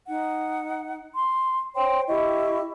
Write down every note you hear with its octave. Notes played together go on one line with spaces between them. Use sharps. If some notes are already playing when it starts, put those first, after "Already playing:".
D#4 F#5
C6
C5 C#5 G5 C6
E4 G4 D#5 C#6